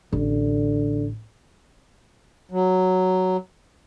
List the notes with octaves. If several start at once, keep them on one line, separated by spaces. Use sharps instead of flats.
A1 D3
F#3